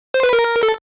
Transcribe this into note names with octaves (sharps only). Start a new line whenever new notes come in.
C5
B4
A#4
A4